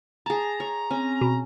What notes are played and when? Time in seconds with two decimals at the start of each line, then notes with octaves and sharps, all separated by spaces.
0.26 G#4 A5 A#5
0.60 C#5
0.91 C4 C#4
1.21 B2